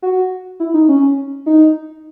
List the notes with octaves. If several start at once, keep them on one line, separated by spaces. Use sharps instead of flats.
F#4
E4
D#4
C#4
D#4